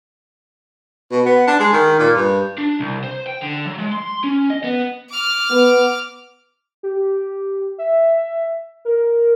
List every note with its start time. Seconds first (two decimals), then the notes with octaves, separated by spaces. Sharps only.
1.11 B2
1.26 B3
1.47 D4
1.60 G#3
1.73 D#3
1.99 A#2
2.15 G2
2.58 D4
2.80 C2
3.04 C5
3.27 G5
3.42 D3
3.66 F#3
3.79 G#3
3.92 C6
4.24 C#4
4.50 D#5
4.64 B3
5.10 D6 F6
5.51 B3
6.83 G4
7.78 E5
8.85 A#4